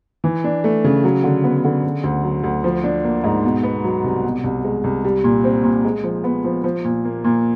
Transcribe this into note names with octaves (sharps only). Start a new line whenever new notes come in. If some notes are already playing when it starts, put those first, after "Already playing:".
E3
D4
A3
C#3
F#3
D3
B3
D3
C#3
D2
F#3
D2
F3
D4
A#3
G#2
B2
B3
F#3
C2
B2
C2
G#3
C2
G3
A#2
C4
A#2
G#3
F3
B3
F3
F3
A#2
A#3
A#2